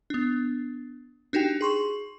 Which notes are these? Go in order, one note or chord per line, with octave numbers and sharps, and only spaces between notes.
B3 D4
D4 D#4 F#4 G4 G5
G#4 C6 C#6